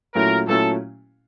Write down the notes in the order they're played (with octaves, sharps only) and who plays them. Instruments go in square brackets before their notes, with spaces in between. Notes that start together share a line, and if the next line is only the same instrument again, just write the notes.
[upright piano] A#2 F#3 A3 C#4 E4 [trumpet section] A#4
[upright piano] A#2 F#3 A3 C#4 E4 [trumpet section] A4